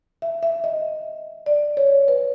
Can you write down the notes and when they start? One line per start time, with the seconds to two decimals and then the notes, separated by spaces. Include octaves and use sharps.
0.22 E5
0.43 E5
0.64 D#5
1.46 D5
1.77 C#5
2.08 B4